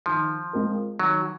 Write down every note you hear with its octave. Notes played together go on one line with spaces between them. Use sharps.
D#3 F3
G#3 C4 F4 A#4
D#3 F#3